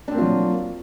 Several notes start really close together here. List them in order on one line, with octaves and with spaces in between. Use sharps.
D4 C4 A#3 F4 F#3